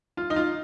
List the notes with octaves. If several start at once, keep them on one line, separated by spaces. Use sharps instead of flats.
F4
D#4
F4